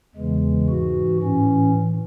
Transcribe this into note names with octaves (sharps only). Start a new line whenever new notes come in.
E2 C#3 E3 G#3
G#2 E3 F#4
A2 E3 C#4